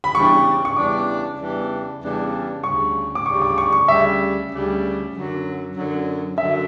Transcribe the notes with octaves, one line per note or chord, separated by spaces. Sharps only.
B5
E2 C#3 E3 G3 D4 C#6
C#6
E2 C#3 E3 G3 D4 D6
E2 C#3 E3 G3 D4
E2 C#3 E3 G3 D4
D2 C#3 G3 C#6
D6
D2 C#3 G3 C#6
D6
C#6
C#6
D2 C#3 G3 E5
D2 C#3 G3
F#2 D3 F#3
F#2 D3 F#3
F#2 D3 F#3 E5